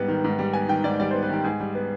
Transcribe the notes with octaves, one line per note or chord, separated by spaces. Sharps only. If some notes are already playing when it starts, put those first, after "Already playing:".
Already playing: G#2 G3 B3
D#3
G#2
G3
B3 G#5
D#3 G5
G#2 D5
G3 D5
B3 C5
B4
D#3 G4
G#2 G#4
G3
B3